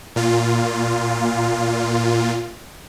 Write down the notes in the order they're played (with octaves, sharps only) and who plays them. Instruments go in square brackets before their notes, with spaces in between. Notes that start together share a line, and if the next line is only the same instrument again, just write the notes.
[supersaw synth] A#2 F4